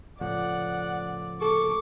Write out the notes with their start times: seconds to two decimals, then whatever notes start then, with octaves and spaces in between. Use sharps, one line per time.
0.21 C#2 A2 F3 D5 F#5
1.41 A4 C#6 D6